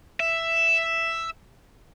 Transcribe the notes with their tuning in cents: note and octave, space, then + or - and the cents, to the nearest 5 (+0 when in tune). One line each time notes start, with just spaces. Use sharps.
E5 +5